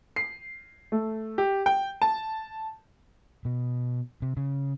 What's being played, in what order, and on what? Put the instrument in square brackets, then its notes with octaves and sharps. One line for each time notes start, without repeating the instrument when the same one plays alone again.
[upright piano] C7
A3
G4
G5
A5
[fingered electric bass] B2
C3
C#3